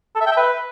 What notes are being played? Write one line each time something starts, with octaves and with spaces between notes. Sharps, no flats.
A4
E5
G5
E5
B4